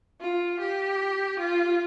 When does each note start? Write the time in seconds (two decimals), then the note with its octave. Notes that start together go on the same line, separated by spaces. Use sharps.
0.21 F4
0.60 G4
1.39 F4